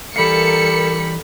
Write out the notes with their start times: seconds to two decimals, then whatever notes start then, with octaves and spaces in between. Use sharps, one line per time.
0.16 E3 G3 A4 A#4 F5 B5 C#7